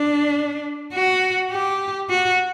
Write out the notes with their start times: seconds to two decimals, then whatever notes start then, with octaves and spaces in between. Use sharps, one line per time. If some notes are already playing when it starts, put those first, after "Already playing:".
Already playing: D4
0.94 F#4
1.51 G4
2.10 F#4